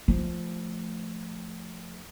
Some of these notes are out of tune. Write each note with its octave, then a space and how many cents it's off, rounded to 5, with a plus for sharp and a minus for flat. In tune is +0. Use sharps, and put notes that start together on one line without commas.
F3 -5 A3 +0